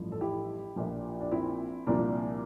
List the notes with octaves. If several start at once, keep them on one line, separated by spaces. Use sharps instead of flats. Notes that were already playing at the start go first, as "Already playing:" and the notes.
Already playing: A1 G2 F3
A4
E4 G4
A#1 A#2 F3
D4
C4 E4
C2 A#2 F3 A#3 D4